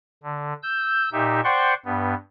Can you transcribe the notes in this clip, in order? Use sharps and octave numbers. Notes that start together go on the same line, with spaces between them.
D3
E6 G6
A#2 D#4 G4 E5
C5 D5 F#5 G5 C6 C#6
G2 B3